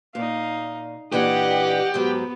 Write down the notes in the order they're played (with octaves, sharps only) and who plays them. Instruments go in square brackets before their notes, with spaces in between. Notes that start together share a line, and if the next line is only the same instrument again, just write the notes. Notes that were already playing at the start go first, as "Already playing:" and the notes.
[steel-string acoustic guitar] A#2 [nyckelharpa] D#4 F5
[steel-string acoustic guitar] A#2 E3 D4 [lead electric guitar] G4 [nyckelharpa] D#5 F#5
[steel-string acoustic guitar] G#2 F#3 [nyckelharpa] B3 B4